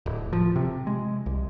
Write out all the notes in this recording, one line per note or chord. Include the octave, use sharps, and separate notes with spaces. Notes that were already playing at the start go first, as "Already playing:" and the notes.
D1
F3
C3
G#3
C2